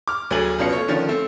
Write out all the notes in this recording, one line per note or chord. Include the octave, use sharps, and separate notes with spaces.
D6 F6
D2 F#3 A3 G#4 G#5 F#7
F#1 B2 C#4 F4 C#7
A3 C#5
D3 D#3 F3 C#4
A3 C4